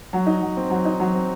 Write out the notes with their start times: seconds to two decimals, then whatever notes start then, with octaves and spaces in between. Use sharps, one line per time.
0.13 F#3
0.26 D#4
0.41 F#3
0.57 C4
0.70 F#3
0.85 D#4
1.00 F#3
1.14 C4